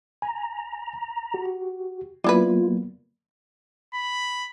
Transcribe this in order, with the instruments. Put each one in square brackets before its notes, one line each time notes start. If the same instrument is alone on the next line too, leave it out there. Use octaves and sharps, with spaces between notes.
[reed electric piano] G#5 [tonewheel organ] A#5
[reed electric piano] F#4 G4
[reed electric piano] F#3 A#3 B3 [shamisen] D4 E4 B4 [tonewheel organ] F4
[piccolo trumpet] B5